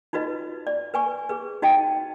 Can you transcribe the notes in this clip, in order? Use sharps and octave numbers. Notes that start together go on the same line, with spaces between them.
D#4 F4 F#4 B4 D#5
D5
B4 G#5 C#6
G#4 B4
D#4 F#4 D#5 G5 A5